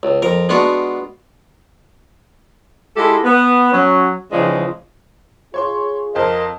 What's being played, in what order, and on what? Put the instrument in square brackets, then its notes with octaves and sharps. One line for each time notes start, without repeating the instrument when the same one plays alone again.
[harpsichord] C#2
F2 A#4
G#3 B3 D4 F4 F#4
[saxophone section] G#3 E4 F4 G4 A4
B3
F#3 C#4
C#3 E3 F3 G#3 C4 D4
[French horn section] F4 G#4 [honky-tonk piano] C#5 C6 C#6
[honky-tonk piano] F2 C5 [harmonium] A#4 D#5 F5